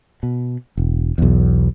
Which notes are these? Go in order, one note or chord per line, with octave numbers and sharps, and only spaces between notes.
B2
E1
B1 E2